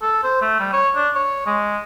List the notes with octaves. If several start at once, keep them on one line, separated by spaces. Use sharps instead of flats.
A4
C5
A3
G3
C#5
D4
C#5
G#3